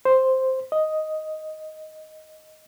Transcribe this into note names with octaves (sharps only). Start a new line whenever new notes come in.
C5
D#5